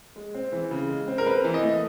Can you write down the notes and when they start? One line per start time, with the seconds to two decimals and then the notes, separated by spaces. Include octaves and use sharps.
0.16 G#3
0.35 C4
0.52 E3
0.71 C#3
0.89 G#3
1.08 C4
1.18 A#4
1.26 C4 B4
1.45 E3
1.54 D#5
1.63 A3